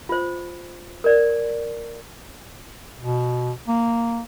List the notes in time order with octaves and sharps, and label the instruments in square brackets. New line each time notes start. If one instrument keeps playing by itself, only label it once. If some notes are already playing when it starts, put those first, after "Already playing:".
[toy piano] F4 C5
A#4 D5
[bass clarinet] B2
A#3